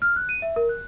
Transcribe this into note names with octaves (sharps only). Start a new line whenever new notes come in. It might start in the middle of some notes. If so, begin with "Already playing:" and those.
F6
F#6
D#7
E5
A#4
F#6